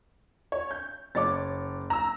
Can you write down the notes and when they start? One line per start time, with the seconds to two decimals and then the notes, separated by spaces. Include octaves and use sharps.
0.52 C#5
0.71 G6
1.15 F#1 C#5 D6 A6
1.90 A#5 E6